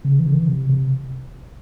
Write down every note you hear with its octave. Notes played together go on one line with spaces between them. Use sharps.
C#3
E3
C#3
E3
C3
C3